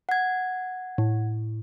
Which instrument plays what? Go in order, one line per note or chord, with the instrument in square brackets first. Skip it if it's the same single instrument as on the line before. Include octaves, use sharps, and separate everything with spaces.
[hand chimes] F#5 G#6
[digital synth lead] A2